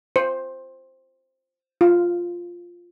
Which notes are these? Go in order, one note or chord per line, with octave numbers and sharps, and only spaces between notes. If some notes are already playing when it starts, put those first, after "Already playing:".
C5
F4